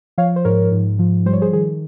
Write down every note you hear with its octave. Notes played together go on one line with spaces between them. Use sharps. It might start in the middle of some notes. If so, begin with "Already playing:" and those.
F3 C#5 F5
C5
G#2 A#4 C#5
G#2
F3
G3 C5
C#5
G#4 C5
D#3 G#4